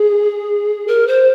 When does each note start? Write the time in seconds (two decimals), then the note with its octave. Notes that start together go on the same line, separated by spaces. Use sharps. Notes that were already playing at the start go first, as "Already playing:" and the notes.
Already playing: G#4
0.88 A#4
1.07 C5